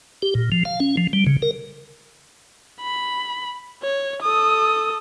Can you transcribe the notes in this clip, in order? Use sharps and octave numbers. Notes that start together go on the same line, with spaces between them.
G4
A#2
F3
F5
C#4
F3
G3
C#3
A#4
B5
C#5
A4 D#6